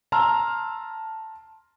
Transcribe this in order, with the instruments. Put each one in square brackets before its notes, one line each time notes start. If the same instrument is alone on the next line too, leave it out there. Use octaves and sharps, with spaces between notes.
[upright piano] A5 A#5 C6 E6 F6